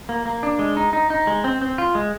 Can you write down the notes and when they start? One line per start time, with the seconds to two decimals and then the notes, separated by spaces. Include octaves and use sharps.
0.09 A#3
0.26 A#3
0.43 D4
0.59 G#3
0.77 D#4
0.93 D#4
1.10 D#4
1.27 G#3
1.44 C4
1.61 C4
1.78 F4
1.95 G#3